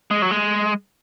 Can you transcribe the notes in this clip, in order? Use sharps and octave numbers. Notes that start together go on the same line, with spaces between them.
G#3
F#3
G#3